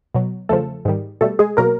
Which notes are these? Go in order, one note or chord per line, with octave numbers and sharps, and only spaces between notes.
B2 F#3
E2 C#3 F3 A3 A4
G#2 D#3 G3
B2 G3 A3 A4
G#3 G#4
B2 F#3 A#3 A#4